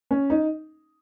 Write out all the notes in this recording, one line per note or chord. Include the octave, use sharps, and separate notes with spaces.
C#4
D#4